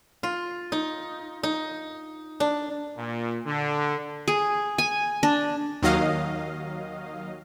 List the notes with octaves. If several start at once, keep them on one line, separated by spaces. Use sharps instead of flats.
F4
D#4
D#4
D4
A#2
D3
G#4
G#5
D4
D#2 D#3 F#3 D#5 F5